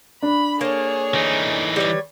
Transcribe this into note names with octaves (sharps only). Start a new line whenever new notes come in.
D4 B5
A#3 G#4 A4 C#5
E3 D#4
G3 B4 C#5